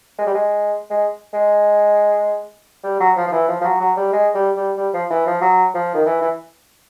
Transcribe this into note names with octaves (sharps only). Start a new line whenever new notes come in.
G#3
G3
G#3
G#3
G#3
G3
F#3
F3
F3
E3
F3
F3
F#3
F#3
G3
G#3
G3
G3
G3
F3
E3
F3
F#3
F3
D#3
E3
E3